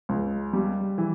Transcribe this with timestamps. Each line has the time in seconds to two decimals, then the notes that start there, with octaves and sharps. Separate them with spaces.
0.09 C#2
0.53 G3
0.98 E3